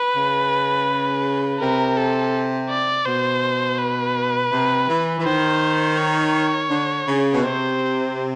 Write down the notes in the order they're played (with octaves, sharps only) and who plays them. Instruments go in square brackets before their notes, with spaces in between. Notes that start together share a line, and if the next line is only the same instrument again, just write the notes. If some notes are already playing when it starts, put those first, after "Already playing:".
Already playing: [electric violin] B4
[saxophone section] C#3
[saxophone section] C3 [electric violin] A#4
[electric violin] A4
D5
[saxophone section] B2 [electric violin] C5
[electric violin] B4
[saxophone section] C3
E3
E3
[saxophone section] D#3 [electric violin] C5
[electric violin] C#5
[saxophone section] D3
C#3
B2
[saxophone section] C3 [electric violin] C5